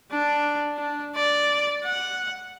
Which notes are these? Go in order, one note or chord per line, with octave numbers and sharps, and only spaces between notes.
D4
D4
D5
F#5